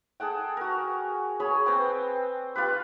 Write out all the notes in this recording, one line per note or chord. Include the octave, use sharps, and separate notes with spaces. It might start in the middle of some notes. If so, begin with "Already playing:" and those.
G#4 A4 F#5 G5
F#4 A#4
G#4 C#5 B5
C4 B4 G5
F4 G4 B4